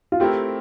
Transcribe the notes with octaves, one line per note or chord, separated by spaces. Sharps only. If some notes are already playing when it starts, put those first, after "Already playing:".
F4
A3 C4 E4 G4 A#4